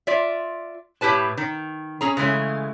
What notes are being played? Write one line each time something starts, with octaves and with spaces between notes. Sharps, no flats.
F4 D5 E5
A2 E4 G4 B4 A5
D#3
C#4 G#4 A#5
C#3 E3 G#3 A3